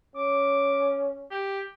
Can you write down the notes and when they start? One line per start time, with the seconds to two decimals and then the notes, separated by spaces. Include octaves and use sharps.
0.16 C#4 D6
1.31 G4